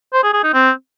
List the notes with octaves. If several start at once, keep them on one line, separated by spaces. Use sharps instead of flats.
C5
G#4
G#4
D#4
C4